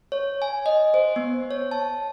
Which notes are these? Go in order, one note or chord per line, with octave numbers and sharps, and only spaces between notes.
C#5
G#5
D#5
C5
B3
C#5
A5